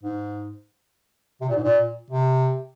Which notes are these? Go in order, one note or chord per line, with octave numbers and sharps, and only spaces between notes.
G#2
C3
A#2
G#2
A#2
C3